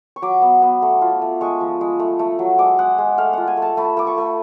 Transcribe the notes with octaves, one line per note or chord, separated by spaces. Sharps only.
C#6
F#3 D6
B3
B3
A3
F4
A3
G#3 C#6
F3
G#3
A3
A3
F#3
G#3 D6
G#3 F#5
G#3
A3 F5
F4 F#5
G#5
A3 A5
A3 B5
A3 D6
C#6
A3